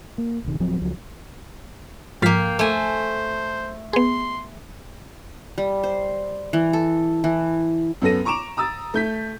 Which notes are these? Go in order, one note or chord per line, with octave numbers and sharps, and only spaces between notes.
A#3
D1 C3 D#3
D1 F3 F#3 C4
C#2 F3 F#3
G#2 F3 A#3 F5 G5 B6
A3 C5 G#5
B3 G#4 C6
G3
C5
E3
A4
E3
F#2 B3 A4 A#6 D#7
A#5 C#6 D6 D7 E7 F7
A#5 D#6 E6 A6
A3 G6 B6